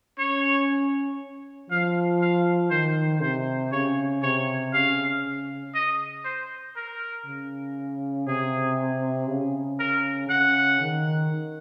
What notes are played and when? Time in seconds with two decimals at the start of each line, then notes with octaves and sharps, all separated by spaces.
0.19 C#4 C#5
1.70 F3 F5
2.21 F5
2.71 D#3 C5
3.21 C3 C5
3.72 C#3 C#5
4.23 C3 C#5
4.74 C#3 F5
5.75 D#5
6.25 C5
6.76 A#4
7.26 C#3
8.27 C3 G#4
9.28 C#3
9.79 A#4
10.30 C#3 F#5
10.81 D#3